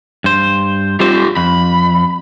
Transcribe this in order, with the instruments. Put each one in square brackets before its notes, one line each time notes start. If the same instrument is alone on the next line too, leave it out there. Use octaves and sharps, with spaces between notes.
[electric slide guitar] G2 C5
[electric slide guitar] G3 C4 C5 [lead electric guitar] F4 G4
[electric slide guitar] F2 [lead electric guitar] B5